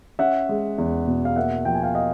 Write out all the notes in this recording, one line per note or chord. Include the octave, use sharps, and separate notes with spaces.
C#4 E5 F#5
G#3
E2
B2
F5
A#3 E5 F#5
F3 G5
G#5
F5 G5
D#5 F5